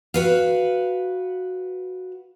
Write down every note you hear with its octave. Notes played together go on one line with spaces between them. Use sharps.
F#4 B4 F5